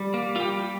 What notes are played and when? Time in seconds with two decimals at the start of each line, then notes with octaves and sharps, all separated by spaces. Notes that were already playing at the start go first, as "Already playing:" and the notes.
Already playing: G3
0.14 A#3
0.36 F4
0.40 G3 G4